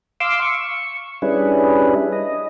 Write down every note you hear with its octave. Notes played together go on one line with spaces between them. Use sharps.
F5 C6 D6 E6
C#6
G3 C#4 D4 E4 G#4 B4
D#5